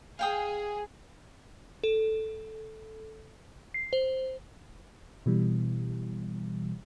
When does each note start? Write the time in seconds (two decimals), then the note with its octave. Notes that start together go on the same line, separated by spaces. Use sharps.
0.19 G#4 F5 G5 D#6
1.84 A4
3.74 C7
3.93 C5
5.26 B2 E3 G3